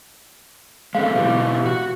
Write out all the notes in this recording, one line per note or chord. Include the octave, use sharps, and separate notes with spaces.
G#3 A3 C4 F5
B2 E3 G4
F#4